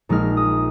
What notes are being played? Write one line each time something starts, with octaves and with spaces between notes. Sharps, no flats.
A#1 A#2 G#3 D#4 F6
D#6